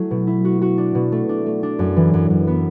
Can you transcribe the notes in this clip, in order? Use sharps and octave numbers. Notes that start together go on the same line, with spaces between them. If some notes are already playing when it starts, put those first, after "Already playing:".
Already playing: F#3 A3 E4
B2
E4
F#4
F#4
D4
B2
A3
D4
A3
D4
F#2
E3
F#2
F#2
B3